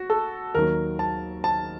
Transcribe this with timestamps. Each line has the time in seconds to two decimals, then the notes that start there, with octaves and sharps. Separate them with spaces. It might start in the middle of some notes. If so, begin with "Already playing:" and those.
Already playing: F#4
0.10 A4
0.55 D#2 D#3 F#3 A#4
0.99 A5
1.44 A5